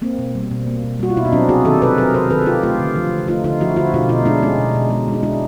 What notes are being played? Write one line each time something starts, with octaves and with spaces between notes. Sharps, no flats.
A#3 C4
B2
G3
B2
A#3
B2
G3 F#4
F4
B2 E4
D#4
F#3 C4 D4
C3 F#4 G#4
D#3 G4 A4
C3 A4 B4
F#3 G#4 A#4
C3 A#4 C5
D#3 A4 B4
G#4
C3 F4 G4
A3 F4 G4
D3
F3
D3
A3 D#4 F4
D3 D#4 F4
F3 E4 F#4
D3 E4 F#4
B2 F4 G4
B2 D#4 F4
G#3 D4 E4
G#3 C#4 D#4
B2
B2
G#3
G#3
D#4
G#3 D4 E4